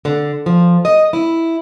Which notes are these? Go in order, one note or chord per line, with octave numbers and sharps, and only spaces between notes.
D3
F3
D#5
E4